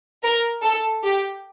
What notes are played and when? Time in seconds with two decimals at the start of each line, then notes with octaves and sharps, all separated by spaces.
0.23 A#4
0.63 A4
1.04 G4